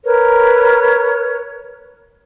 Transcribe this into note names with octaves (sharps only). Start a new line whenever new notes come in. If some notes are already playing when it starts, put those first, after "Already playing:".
A#4 B4 C#5